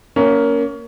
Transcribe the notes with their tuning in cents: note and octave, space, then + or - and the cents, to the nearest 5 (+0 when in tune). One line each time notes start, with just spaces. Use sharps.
A#3 +0 C#4 +20